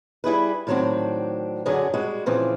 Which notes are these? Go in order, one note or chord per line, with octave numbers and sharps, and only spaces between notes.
G3 E4 G#4 B4
A2 D#3 F#3 A#3 C4 D4
F#2 D3 F#3 C#4 D4 G#4
G3 G#3 F#4
A#2 C#3 E3 F3 C4